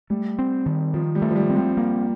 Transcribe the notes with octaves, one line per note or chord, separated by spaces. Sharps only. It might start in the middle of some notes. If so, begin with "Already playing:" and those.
G3 A3
C4
D#3
D#3 F3
G3
A3
F3
G3
C4
G3
A#3